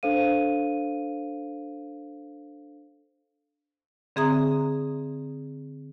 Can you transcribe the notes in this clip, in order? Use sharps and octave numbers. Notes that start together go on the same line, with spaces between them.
D4 A4 C5 F5 D#7
D3 C4 G#4 E5 A#5 D#6